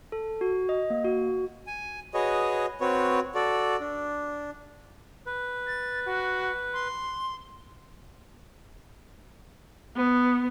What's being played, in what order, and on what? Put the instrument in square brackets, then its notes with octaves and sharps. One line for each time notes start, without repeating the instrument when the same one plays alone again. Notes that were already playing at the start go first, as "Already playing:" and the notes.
[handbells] A4
F#4
D#5
A#3
F#4
[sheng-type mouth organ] G#5
F#4 G#4 B4 C#5 D#5
C4 F#4 B4 C#5
F#4 A4 D5
D4
[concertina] B4
[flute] A6
F#4
C6
[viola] B3